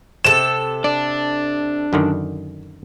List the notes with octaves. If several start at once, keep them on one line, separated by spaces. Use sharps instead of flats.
C3 A4 E7
D4 D5
F#2 D3 D#3